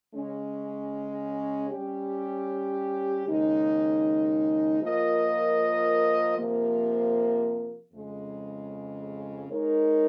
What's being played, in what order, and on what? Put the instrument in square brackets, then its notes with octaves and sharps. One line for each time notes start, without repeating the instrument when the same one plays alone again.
[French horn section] C#3 G#3 C#4
G3 C#4 G4
D#2 C#3 G#3 D#4
F3 A#3 F4 A#4 D#5
C3 F3 A#3
F2 C#3 G#3
G#3 D#4 A#4 C#5